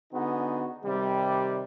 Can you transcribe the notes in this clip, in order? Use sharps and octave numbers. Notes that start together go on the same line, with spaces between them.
D3 B3 D#4 F#4 G#4
C3 D#3 G3